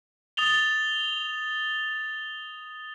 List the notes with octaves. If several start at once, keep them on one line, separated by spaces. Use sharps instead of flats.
D#6 A6 F7 G7